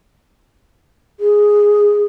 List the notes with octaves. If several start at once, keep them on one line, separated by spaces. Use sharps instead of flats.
G#4